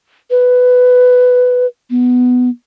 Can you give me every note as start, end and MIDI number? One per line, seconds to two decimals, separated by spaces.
0.30 1.66 71
1.90 2.49 59